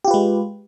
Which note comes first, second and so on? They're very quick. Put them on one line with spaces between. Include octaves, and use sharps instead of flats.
G4 F4 B4 G#3